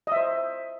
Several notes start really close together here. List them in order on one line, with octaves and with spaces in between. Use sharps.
D#5 E5 C5